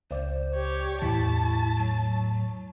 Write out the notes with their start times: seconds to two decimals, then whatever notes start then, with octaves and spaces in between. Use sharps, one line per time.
0.11 C#2 C5 D5
0.56 G4 C#5
1.02 E2 A2 E4 A5 C#6 B6
1.77 F#3